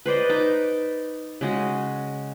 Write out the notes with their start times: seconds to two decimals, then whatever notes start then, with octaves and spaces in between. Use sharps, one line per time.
0.06 B4 C5 D5 D#5
0.29 D#4 A5 D6
1.41 C#3 G#3 F#4